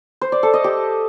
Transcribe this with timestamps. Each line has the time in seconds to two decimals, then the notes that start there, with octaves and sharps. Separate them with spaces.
0.21 C5
0.32 D5
0.43 A4
0.54 D#5
0.64 G4